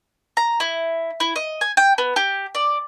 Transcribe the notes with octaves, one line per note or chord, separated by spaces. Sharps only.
A#5
E4
E4
D#5
G#5
G5
B3
G4
D5